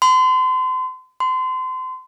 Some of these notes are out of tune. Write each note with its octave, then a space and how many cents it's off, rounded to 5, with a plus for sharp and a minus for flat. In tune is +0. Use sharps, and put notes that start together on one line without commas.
C6 -35
C6 -30